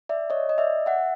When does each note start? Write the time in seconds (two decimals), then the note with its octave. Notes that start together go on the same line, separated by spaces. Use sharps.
0.09 D5 E5
0.30 C#5 D#5
0.49 D#5
0.58 D5 E5
0.86 E5 F#5